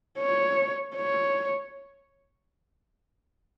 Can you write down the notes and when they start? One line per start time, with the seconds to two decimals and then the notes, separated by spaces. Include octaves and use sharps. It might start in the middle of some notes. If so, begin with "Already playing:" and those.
0.19 C#5
0.96 C#5